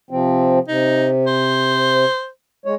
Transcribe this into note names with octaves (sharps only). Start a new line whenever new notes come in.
C3 F3 C4
C3 D#4
C5
G#3 C#5